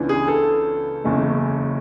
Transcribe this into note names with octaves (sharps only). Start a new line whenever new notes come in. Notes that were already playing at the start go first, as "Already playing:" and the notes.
Already playing: C#2 C#3 E3 B3 D4
G#4
A4
F#1 E2 C#3 G#3